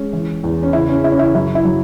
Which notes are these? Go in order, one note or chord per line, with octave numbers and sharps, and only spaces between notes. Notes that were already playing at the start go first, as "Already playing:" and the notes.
Already playing: G#3 C#4
E3
E2
C#4
C#3 E4
C#4
C#3 E4
C#4
E4
F#2 E4
E4
F#3